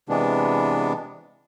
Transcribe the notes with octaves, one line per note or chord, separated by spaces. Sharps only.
C3 E3 G#3 B3 D4